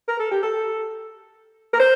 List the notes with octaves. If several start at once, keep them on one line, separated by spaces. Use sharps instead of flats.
A#4
A4
G4
A4
A#4
C5